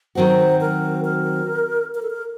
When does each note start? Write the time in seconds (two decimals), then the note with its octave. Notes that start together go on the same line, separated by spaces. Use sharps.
0.15 D#3 F#3 C4 F#4 C5
0.61 A#4
1.04 A#4
1.95 A#4
2.02 A4
2.10 A#4